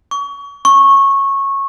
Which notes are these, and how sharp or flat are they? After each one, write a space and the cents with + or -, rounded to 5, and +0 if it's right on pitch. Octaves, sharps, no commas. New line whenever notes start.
C#6 +30
C#6 -15